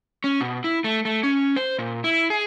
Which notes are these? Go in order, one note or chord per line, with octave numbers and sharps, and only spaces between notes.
C#4
B2
E4
A3
A3
C#4
C5
A#2
E4
G#4